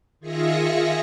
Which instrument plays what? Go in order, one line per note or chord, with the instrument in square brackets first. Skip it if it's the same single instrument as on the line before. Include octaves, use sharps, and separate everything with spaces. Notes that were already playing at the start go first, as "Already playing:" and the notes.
[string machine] D#3 F4 G#4 E5 A#6 C#7